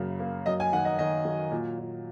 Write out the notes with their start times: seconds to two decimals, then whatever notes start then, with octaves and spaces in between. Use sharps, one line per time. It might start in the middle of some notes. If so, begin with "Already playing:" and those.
Already playing: F#2 C#3 A#3
0.19 A#3
0.46 F#2 D#5
0.60 G#5
0.72 D#3 F#5
0.85 D#5
0.99 D#3 D#5
1.25 F#3
1.51 A#2
1.78 A#2